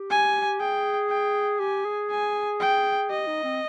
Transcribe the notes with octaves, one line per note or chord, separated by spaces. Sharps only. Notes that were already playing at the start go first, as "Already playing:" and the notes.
Already playing: G4
G#5
G#4 G5
G5
G4 G#5
G#4
G#5
G5
G4 D#5
D#4
C4